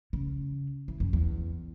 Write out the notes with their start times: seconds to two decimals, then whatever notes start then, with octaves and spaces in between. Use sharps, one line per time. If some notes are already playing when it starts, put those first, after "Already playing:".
0.13 C#3
0.88 E3
1.00 F#2
1.13 E2